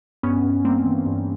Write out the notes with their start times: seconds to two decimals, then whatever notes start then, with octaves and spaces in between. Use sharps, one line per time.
0.23 G2 B3 C#4
0.44 G2
0.65 G3 A#3 C4
0.85 E3
1.06 G2